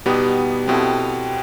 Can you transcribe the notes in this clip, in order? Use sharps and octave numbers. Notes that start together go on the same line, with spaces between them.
B2 G3 B3 D#4 G4
B2 B3 C4 E4 A4